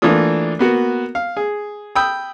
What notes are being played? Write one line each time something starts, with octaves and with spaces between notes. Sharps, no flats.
E3 A3 A#3 D4 F4 D#6
A#3 B3 F#4
F5
G#4
G5 B5 D#6 E6